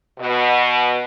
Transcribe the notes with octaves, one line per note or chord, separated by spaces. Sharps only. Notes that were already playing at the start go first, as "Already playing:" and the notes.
B2